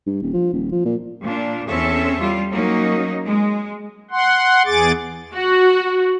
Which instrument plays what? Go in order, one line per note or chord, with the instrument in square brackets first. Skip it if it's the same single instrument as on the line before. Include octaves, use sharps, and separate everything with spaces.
[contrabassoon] G2
D#1
F3
D#1
F3
A#2
[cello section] A#2 D4
E2 C4 C#4 A4 C#5 E5
G3 F4
F#3 A#3 C#4 D#4
G#3
[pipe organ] F#5 C6
E2 G#4 D6 A6
[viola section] F#4